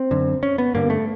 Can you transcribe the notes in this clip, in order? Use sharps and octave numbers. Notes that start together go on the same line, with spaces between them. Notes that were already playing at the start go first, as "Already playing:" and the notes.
Already playing: C4
F#2 D3
C#4
B3
G2 D3 A#3
A3